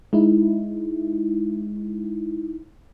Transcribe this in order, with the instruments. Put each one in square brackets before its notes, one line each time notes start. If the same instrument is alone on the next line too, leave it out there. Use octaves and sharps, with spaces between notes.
[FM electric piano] G#3 D#4 E4